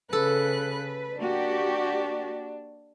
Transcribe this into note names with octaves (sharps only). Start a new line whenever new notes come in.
C#3 A4 B4 F#6
A#3 D4 F#4 G4